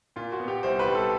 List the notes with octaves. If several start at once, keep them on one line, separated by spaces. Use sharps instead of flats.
A#2 F4
F#4
B3
G4
C2 C5
B4
G3
A4